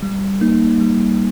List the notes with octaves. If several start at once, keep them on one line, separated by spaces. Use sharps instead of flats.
G3
A#3 D#4
G3